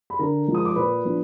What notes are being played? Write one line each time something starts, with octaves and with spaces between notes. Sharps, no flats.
B5
D3 A#4 A#5
F3 G#3 D#4
D#6
D6
A#2 B4 B5
F3 B3 D4